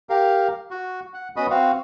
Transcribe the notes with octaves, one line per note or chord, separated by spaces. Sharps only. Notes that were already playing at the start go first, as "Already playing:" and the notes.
G4 A#4 F5
F#4
F#5
B3 C#4 F#4 D#5 B5 D#6
C4 F#4 F5